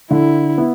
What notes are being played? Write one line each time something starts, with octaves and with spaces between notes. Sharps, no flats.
D3 E4
B3 E4